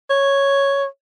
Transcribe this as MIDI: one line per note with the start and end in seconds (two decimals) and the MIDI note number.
0.10 0.86 73